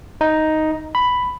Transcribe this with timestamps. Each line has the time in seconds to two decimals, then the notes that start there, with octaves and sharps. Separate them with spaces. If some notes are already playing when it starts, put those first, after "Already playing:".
0.21 D#4
0.95 B5